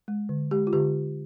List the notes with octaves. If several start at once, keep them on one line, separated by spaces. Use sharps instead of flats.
G#3
D3
G#3 G4
F4
D3 G4